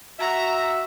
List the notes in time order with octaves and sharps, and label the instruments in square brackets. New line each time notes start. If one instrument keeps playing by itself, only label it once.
[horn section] F#4 E5 [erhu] A#5